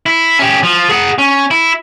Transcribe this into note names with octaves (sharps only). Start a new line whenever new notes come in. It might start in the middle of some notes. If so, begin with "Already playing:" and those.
E4
C#4 G4
F3
G#4 F#5
C#4
E4